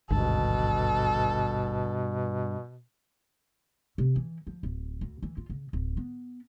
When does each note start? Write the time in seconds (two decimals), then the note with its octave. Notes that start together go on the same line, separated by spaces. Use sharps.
0.10 G#1 D2 G2 B2 A4
3.98 C3
4.16 E3
4.47 F3
4.63 D1
5.01 D2
5.22 E3
5.37 F4
5.49 C#3
5.73 D1
5.97 B3